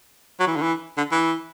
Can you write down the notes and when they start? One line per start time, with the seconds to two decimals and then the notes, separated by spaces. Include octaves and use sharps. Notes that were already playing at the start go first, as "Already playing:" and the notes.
0.40 F#3
0.47 E3
0.56 D3
0.62 E3
0.97 D3
1.12 E3